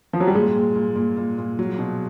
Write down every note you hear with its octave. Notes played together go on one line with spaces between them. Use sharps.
F3
F#3
G3
A#2 G#3
A#2
A#2
A#2
A#2
A#2
F#3
B2